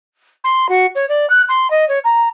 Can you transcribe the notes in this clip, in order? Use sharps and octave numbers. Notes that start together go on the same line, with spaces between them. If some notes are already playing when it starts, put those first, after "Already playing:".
C6
F#4
C#5
D5
F#6
C6
D#5
C#5
A#5